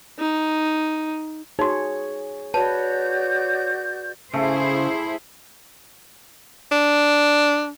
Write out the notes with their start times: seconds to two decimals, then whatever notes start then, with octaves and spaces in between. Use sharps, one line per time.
0.19 D#4
1.59 D#4 F#4 G#4 C#5
2.54 F#4 B4 C#5 D5 A5 G6
4.34 C#3 A3 E4 G#4 C5
6.72 D4